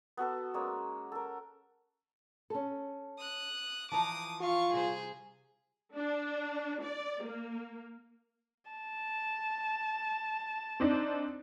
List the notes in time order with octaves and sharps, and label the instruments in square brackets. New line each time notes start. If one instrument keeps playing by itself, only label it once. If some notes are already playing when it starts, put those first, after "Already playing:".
[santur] B3 F#4 A4 B4
G#3 A#3 C#4
A4 A#4
[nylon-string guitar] C#4 A4
[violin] D#6 F#6
[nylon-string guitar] E3 F3 [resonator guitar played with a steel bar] A5 A#5 [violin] D6 D#6
[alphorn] F4 [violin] F5 C#6
[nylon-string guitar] C3 G3 [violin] G#4 C5
[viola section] D4
D5
A#3
[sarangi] A5
[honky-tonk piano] C4 D4 D#4